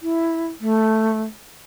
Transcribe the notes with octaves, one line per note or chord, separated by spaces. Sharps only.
E4
A3